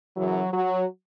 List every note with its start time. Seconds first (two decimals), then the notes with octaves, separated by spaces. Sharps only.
0.16 F#2 C#3 E3 F#3
0.52 F#3